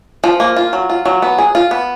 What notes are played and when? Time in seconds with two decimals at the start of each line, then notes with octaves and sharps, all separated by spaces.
0.24 F3
0.40 A#3
0.56 F4
0.73 F#3
0.90 F4
1.06 F#3
1.22 B3
1.38 G#4
1.55 F4
1.71 B3